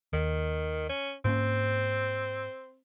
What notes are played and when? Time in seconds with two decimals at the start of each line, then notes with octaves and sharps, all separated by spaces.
0.13 D#2 D#3
0.89 C#4
1.25 G#2 A#3 C4 C#4